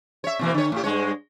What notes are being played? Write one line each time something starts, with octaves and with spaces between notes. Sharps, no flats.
C#5 E5
B2 E3 A#3
D3 C#5
A2 G4
G2 G#3 C#5